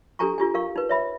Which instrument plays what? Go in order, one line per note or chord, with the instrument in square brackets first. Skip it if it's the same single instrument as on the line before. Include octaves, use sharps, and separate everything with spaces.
[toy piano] D4 G4 A4 G#5 A#5 C#6
D4 F4 G4 G#5
A#4 F5 C#6
D#4 B4
C#5 E5 B5